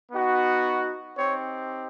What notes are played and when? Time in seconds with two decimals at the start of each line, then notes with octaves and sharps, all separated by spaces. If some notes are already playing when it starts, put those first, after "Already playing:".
0.12 B3 D#4 F#4
1.17 C4 D#4 G4 C#5